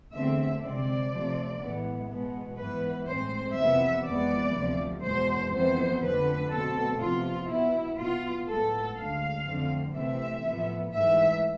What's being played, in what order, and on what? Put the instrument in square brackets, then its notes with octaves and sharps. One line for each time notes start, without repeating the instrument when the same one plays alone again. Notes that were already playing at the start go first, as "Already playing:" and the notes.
[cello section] E2 D3 A3 C4 E5
C3 G#3 C4 D5
C3 F3 A3 C4
A2 E3 G#3 B3
B2 G#3 B3
G#2 E3 B3 B4
A2 G#3 C4 C5
F2 C3 E3 B3 E5
F2 E3 G#3 B3 D5
D2 C3 F3
E2 B2 G#3 C5
F2 E3 B3 C5
F2 D3 A3 B4
B2 A3 C4 A4
E2 C3 F3 F4
B2 B3 E4
B2 B3 F4
A2 G#3 B3 A4
D2 D3 G#3 F5
F2 D3 A3 C4
C3 E3 A3 C4 E5
A2 F3 B3
G#2 E3 A3 E5